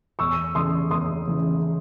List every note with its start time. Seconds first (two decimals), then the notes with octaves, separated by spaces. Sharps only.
0.19 E2 C#6 E6
0.55 C#3 E3 C6 D#6
0.91 E2 C6 D#6
1.27 C#3 E3